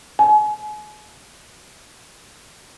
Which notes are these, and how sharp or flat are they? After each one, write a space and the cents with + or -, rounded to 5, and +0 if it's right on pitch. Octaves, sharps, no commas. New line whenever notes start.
G#5 +35